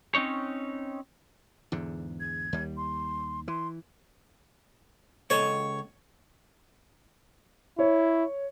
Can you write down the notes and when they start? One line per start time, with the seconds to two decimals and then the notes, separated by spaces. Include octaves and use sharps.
0.15 C4 C#4 D#4 C#5
1.72 E2 G#2 D3
2.20 G#6
2.53 D#2 G3
2.77 C6
3.48 E3 C6
5.30 C#2 A4 C#5 D#5
7.79 E4 C#5